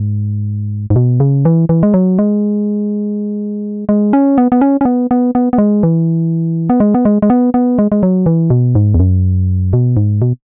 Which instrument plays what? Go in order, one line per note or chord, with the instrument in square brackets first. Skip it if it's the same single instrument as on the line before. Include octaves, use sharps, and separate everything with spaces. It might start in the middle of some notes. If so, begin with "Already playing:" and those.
Already playing: [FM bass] G#2
G#2
B2
C#3
E3
E3
G#3
F#3
G#3
G#3
C#4
B3
B3
C#4
C#4
B3
B3
B3
B3
G#3
E3
B3
G#3
B3
G#3
G#3
B3
B3
G#3
G#3
F#3
E3
B2
G#2
E2
F#2
B2
G#2
B2